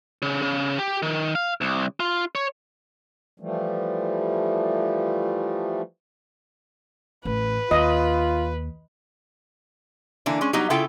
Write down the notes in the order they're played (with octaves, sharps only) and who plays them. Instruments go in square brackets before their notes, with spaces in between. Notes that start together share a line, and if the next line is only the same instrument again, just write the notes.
[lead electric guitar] C#3
C#3
G4
D#3
F5
C2
F4
C#5
[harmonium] E3 F3 G3 A3
[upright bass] A1 [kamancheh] B4
[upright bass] D#2 [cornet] F4 [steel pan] D#5
[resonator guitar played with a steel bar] D3 E3 A#3 D4
G#3 C#4
F#3 G3 B3 D#4
C#3 E4 F4 A4 G5